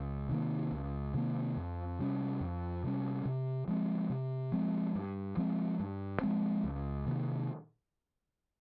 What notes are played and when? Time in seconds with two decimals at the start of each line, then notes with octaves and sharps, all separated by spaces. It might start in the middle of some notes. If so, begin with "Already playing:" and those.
Already playing: C#2
0.29 C3 D#3 A#3
0.72 C#2
1.14 C3 D#3 A#3
1.57 F2
1.99 C3 G3 C#4
2.41 F2
2.83 C3 G3 C#4
3.26 C3
3.68 F3 G#3 C4
4.10 C3
4.52 F3 G#3 C4
4.95 G2
5.37 F3 G#3 C4
5.80 G2
6.22 F3 G#3 C4
6.64 C#2
7.06 C3 D#3 A#3